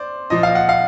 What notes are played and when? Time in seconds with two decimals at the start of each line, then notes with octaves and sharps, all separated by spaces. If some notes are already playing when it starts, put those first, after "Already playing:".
Already playing: C5 D5
0.30 A#2 F3 D#5
0.43 F5
0.55 F#5
0.69 F5